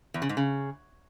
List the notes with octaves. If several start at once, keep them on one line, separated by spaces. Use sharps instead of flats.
E2
C#3
G#2
C#3